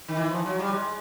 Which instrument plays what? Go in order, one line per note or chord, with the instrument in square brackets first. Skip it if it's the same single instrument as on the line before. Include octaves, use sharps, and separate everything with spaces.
[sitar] D#3
E3
F3
F#3
G3
G#3